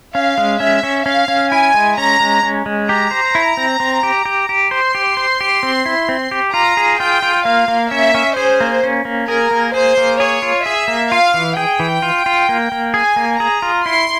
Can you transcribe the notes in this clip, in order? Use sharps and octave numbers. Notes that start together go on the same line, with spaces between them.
C#4 F5
G#3
C#4 E5
C#4
C#4 F5
C#4
E4 G#5
G#3
C#4 A#5
G#3
C#4
G#3
G4 A#5
C5
E4
C4
C4
G4
G4
G4
C5 C6
G4
C5
G4
C4
E4
C4
G4
F4 A#5
G#4
F4 G5
F4
A#3 F5
A#3
C#4 E5
C#4
G#4 C5
A#3
C#4
A#3
G#4 A#4
A#3
G#4 C5
A#3
G#4 C#5
F4
G#4 E5
A#3
F4 F5
E3
G#4 G5
E3
F4
F4
A#3
A#3
G#4 G#5
A#3
G#4 A#5
F4
E4 C6